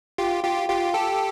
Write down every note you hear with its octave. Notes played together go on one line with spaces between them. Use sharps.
F4 G4
F4 G4
F4 G4
G4 A4